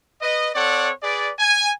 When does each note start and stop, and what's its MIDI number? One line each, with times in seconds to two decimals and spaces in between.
0.22 0.49 71
0.22 0.49 75
0.55 0.90 60
0.55 0.90 69
0.55 0.90 73
0.55 0.90 74
0.55 0.90 78
1.03 1.30 68
1.03 1.30 71
1.03 1.30 74
1.39 1.70 80